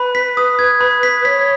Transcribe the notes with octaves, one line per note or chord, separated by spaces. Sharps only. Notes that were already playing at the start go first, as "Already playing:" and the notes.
Already playing: B4 B5
B6
D#6
G#6
B5
B6
C#5 B6